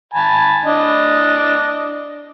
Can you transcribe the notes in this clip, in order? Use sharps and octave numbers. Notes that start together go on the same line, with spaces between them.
G#5 A5 B5
D4 D#5